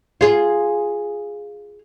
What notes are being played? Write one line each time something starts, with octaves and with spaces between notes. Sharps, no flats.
F4 G#4